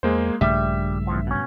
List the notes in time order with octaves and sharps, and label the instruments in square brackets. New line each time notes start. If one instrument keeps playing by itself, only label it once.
[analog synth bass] E2 [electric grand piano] G#3 A#3 C5
[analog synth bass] A#1 [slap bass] G2 C#3 A3 [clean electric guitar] G3 [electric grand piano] E5
[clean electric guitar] E2 A2 F3
B2 C#4